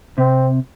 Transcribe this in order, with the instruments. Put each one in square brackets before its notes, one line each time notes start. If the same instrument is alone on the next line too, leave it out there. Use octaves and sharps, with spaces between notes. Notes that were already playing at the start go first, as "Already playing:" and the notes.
[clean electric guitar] C3 [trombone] C4